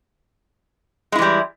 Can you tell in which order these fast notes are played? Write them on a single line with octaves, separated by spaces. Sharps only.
G#3 E4 E3 G3